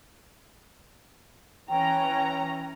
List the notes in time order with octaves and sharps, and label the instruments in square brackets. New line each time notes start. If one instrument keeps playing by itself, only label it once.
[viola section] E3 C#4 A#5 [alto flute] G5